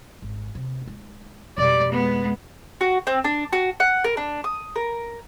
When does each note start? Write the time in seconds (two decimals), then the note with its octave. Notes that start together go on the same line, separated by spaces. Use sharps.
0.22 G#1
0.55 C3
0.85 G#3 D#4
1.58 F2 B2 G3 D5
1.93 G#3 B3
2.81 F#4
3.07 C4
3.24 D4
3.53 F#4
3.80 F#5
4.04 A#4
4.17 D4
4.44 D#6
4.76 A#4